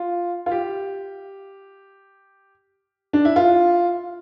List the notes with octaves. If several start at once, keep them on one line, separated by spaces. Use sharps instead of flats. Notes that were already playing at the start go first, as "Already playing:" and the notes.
Already playing: F4
F4
G4
D4
E4
F4